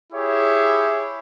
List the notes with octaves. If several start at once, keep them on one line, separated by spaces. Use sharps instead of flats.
E4 G4 G#4 C#5 E5